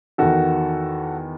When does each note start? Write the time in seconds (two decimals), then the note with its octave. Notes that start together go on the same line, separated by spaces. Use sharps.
0.18 E2 D#3 F#4 A4